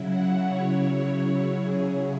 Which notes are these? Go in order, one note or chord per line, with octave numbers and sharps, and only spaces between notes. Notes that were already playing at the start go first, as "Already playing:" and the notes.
Already playing: C#3 F#3 E4
F#5
C#5
C#5
G#4